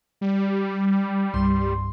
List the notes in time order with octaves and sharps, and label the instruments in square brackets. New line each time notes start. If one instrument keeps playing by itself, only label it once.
[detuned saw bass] G3
[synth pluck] C2 G2 C6